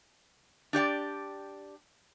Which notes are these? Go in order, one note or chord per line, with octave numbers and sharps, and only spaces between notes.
D4 G4 D5 G5